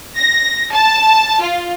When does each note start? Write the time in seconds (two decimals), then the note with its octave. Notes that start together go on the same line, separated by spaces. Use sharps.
0.17 A#6
0.71 A5
1.41 F4